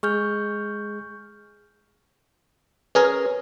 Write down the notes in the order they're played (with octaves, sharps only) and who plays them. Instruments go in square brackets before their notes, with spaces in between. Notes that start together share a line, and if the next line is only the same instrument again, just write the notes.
[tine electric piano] G#3 G#4 [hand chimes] C#6 F6 G6
[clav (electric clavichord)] C#4 G#4 A#4 [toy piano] B4